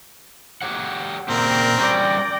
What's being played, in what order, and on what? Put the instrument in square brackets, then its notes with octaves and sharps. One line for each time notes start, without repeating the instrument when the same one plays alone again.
[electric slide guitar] G4 C#5 F#5
[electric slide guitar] A#2 C#3 G4 [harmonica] C4 A#4
[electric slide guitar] G3 C#4 [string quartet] D5 G5 A#6